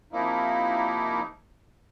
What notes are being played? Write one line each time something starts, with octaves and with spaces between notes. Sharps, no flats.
C3 F3 A#3 D#4 E4